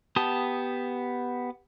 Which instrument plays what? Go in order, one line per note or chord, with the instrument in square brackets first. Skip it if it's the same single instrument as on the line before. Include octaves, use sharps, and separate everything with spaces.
[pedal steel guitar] B3 G4 A5 D#6